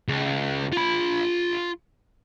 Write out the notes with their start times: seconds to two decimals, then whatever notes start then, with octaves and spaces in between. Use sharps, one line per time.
0.08 C#2
0.73 F4 B5